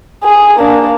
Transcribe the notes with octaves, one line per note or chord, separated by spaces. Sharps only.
G#4
A#3 D4